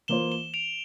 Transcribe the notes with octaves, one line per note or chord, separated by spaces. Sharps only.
E3 A#3 F4 C5 E7 G7
E7 G7
D7 F7